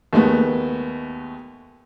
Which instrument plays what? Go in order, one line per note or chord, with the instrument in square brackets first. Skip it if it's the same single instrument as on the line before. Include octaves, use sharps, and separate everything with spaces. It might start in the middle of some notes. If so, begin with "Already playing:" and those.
[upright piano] D#2 G#3 A3 B3